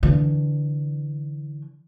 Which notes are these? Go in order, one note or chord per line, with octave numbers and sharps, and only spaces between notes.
D3 E3